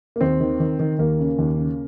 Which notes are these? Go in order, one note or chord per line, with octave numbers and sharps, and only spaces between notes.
A#3
D#2 C4
D#3
D#3
D#3
D#2 A#3
C#3
D#2
C#3